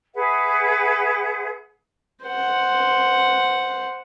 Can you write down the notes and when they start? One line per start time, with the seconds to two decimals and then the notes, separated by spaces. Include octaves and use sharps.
0.14 G#4 B4 E5 F#5
2.23 C5 F#5